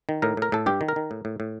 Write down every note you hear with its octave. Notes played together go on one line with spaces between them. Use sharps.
D#3
A2 A#4
A2 A#4
A2 A4
G2 G4
D#3
A#4
D#3
A2
A2
A2